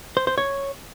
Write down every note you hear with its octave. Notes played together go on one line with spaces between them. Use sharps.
C5
C5
C#5